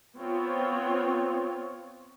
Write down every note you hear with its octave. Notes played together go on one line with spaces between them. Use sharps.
B3 C4 F4 C#5